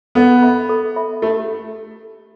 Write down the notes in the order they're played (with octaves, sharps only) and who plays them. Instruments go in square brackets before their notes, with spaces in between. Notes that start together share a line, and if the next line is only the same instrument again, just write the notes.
[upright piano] B3 [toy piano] A4
[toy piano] E5 B5
A4
E5 B5
[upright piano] A3 [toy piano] G4